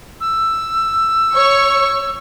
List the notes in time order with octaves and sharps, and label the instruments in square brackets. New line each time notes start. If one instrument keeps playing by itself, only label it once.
[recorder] E6
[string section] C#5 C#6